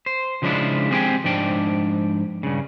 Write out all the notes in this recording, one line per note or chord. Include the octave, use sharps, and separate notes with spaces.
C5
C#3 F3 G#3 D4 E4 F4
G#3 C4 D#4 G4 G#4 G5
G#2 F3 D4 G5
G2 C#3